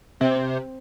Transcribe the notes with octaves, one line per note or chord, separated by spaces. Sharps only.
C3 C4